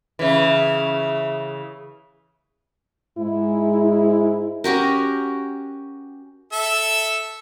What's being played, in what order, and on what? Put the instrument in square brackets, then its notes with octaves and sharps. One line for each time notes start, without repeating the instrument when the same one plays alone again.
[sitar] C#3 E3
[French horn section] G#2 G#3 [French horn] E4
[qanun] C#4 F#4 G4 A#4
[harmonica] A4 E5